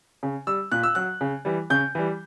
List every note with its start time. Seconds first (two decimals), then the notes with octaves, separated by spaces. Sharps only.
0.23 C#3
0.47 G3 E6
0.72 A#2 F#6
0.83 E6
0.95 F#3 F#6
1.21 C#3
1.45 E3 G3
1.70 C#3 G6
1.95 E3 G3